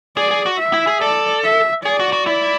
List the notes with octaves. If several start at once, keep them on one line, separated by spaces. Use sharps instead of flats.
G#4 D5
G#4
F#4
E5
E4
G#4
A4 D5
E5
G#4 D5
F#4
F#4
E4 D5